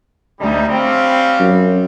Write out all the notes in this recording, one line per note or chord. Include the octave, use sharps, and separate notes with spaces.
D2 G3 D#4
G3 C4 C#4 F5
F#2